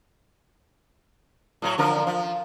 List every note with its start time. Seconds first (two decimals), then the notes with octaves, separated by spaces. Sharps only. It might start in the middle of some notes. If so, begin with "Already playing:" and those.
1.62 A2 F#3 C#5
1.78 D3 F3 A#4
2.07 F3